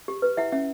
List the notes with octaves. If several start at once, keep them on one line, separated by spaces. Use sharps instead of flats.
G4
B4
E4 E5 F#5
C#4 E5 F#5